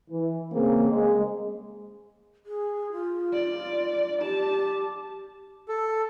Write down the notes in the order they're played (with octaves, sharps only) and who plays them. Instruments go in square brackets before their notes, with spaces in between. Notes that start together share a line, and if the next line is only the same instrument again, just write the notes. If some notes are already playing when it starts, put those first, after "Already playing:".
[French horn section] E3
C#3 A#3 C4 G#4
G#3
[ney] G#4
F4
[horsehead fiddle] D5
[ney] G4 [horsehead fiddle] A5
[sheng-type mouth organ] A4